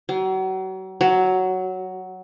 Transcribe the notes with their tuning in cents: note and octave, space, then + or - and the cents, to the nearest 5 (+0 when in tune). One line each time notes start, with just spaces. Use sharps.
F#3 +35
F#3 +5